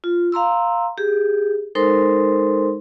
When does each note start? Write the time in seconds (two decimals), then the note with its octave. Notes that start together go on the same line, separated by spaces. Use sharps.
0.04 F4
0.32 F5 A#5 C6 E6
0.98 G4 G#4
1.75 G#3 D#4 A4 A#4 C5 C6